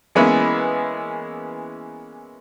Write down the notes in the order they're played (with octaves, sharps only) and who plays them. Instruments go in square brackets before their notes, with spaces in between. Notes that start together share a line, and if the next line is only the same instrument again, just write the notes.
[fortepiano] E3 G#3 A#3 B3 C#4 E4